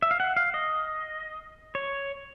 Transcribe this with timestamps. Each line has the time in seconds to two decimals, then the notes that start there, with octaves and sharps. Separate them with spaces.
0.02 E5
0.11 F5
0.20 F#5
0.37 F5
0.54 D#5
1.75 C#5